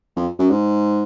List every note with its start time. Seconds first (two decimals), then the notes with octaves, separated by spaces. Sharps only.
0.17 F2
0.39 F#2
0.50 G#2